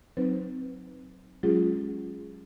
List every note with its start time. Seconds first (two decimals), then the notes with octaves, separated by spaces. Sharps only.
0.17 F#3 C4 D#4 B4 C5
1.43 F#3 G#3 C#4 F4 G4 G#4